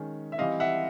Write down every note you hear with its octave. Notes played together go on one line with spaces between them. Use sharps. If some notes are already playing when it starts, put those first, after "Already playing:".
Already playing: D#3 G#3 C#4
E5
E3 G3 C4 D#5 F5
E5 F#5